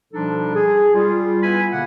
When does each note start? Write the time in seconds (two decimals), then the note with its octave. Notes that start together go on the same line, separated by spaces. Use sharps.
0.13 B2 F3 G3 D4 D#4 A4
0.54 G#4
0.94 G3 F4
1.42 B3 E4 B4 G#5 B5
1.71 B2 D3 A#3 F#5